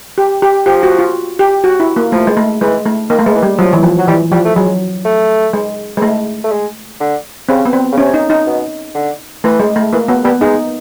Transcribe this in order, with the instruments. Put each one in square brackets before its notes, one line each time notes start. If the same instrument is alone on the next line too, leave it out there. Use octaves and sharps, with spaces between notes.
[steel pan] G4
G4
[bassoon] F3 [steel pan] G4
[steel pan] F#4
F4
G4
F#4
E4
A#3
[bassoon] F3 [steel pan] A3
[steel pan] G#3
A3
[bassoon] E3 [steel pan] G#3
[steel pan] A3
[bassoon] D#3 [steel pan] A#3
[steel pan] A3
G#3
[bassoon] E3
[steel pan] G3
[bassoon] F3 [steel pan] F#3
[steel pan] E3
F3
[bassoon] F#3
[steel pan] E3 [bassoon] G3
[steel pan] F3 [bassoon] G3
[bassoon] A3
[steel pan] F#3 [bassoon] G#3
[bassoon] A3
[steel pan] G#3
G#3
A3
[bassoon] A3
G#3
D3
[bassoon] C#3 [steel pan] C4
[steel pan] B3
C4
[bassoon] C#3
[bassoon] C3 [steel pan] C#4
[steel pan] D#4
D#4
[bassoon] B2
D3
[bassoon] E3 [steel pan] A3
[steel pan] G#3
A3
[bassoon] E3 [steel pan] A#3
[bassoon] F#3 [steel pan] B3
[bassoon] G3 [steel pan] B3
[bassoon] G#3 [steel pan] D#4